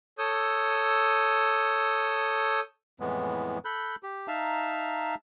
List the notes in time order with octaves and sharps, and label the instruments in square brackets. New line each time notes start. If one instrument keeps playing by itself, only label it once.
[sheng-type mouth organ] A4 C#5 D#6 E6 G6
[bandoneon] F2 A2 E3 G#3 B3
A4 B5 F#6 G6
G4
D#4 E5 F5 A5 A#5